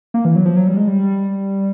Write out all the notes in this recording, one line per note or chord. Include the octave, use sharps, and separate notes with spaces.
A#3
E3
F#3
F3
F#3
G3
G#3
G3